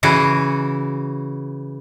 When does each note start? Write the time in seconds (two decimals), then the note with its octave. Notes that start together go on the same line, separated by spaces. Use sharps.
0.03 C#3 E3 F#4